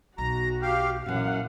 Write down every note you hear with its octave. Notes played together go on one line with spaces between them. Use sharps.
B1 F#4 A#5
G4 F5
F#2 A#2 E3 F5 F#5